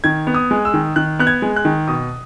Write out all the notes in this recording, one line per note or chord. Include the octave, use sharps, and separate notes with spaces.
D#3 G#6
B3
D#6
G#3
E6
D#3
D#3 F#6
B3 F#6
G#6
G#3
F#6
D#3
B2 D#6